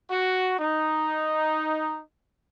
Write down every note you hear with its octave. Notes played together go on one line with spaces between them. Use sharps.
F#4
D#4